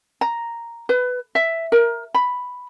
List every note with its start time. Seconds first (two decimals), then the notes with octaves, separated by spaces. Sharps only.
0.21 A#5
0.89 B4
1.35 E5
1.72 A#4
2.14 B5